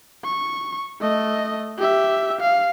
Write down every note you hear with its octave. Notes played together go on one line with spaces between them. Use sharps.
C#6
A3 D#5
G4 E5
F5